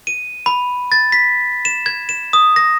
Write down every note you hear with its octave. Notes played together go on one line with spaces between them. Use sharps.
D#7
B5
A6
B6
E7
G#6
E7
D#6
A#6